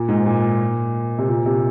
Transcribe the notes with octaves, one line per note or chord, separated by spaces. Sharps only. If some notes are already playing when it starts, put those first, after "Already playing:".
Already playing: A#2
G#2
A#2
C3
A#2
C3